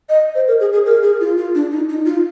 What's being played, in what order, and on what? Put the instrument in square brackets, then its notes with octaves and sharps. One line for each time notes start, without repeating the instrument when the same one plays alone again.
[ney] D#5
C5
A#4
G#4
G#4
A#4
G#4
F4
F4
D4
D#4
D#4
F4